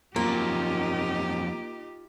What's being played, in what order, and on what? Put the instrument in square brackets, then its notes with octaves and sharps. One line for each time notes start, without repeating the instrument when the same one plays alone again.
[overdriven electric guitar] F2 F#3 [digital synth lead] A#3 [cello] D#4 G4 [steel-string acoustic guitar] F4